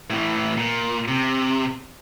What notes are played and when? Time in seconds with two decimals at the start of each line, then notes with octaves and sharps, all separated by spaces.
0.10 A2 E3
0.57 A#2
1.08 C3